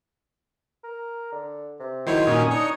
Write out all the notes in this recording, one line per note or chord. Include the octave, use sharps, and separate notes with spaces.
A#4
D3
C3
D#3 F#3 G#3 E4 C5 C#5
A#2 C#4 D#4 G#5
D4 D#4 C#5 C#7